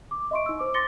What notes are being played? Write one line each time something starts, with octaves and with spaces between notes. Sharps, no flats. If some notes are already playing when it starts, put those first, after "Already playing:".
D6
D#5 E5 C6 C#6 D7
D#4 E6
C5 D6
C6 D6 A6 A#6 C#7 G7